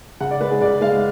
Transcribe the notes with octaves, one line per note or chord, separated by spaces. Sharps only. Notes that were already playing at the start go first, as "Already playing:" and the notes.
C#3 F#5
D5
G#3 B4
G#4
C#3 D5
G#3 F5